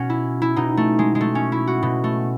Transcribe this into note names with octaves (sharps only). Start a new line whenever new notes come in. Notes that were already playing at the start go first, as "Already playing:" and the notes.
Already playing: B2 C#4 F#4
E4
E4
B2 D#4
A3
G#3
G#3
A3
C#4
E4
F#4
B2
A3